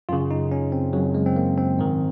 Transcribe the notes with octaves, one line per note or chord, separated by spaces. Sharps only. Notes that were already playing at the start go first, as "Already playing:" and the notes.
F#2 C#3 F4
D#4
C#4
C4
F#2 C#3 F#3
G#3
C4
A#3
C4
G#2 D#3